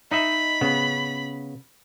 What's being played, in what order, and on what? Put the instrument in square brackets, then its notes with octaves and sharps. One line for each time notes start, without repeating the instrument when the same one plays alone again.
[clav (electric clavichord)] D#4 D#5 E5 [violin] B5
[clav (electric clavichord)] C#3 B3